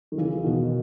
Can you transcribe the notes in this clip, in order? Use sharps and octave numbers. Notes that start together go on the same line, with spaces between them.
D#3
C#3 E3
E3
B2 D#3